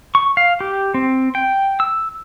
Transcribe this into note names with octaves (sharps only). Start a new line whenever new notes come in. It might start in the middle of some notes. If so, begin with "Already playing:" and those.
C#6
F5
G4
C4
G5
E6